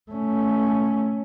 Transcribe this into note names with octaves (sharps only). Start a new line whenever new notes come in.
A3 C#4